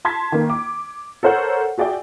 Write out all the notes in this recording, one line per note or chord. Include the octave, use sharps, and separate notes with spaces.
A5 C6 G#6 B6
D#3 A#3
D6
A4 A#4 C5 C#5 F#5
F#4 G#4 D5 E5 G5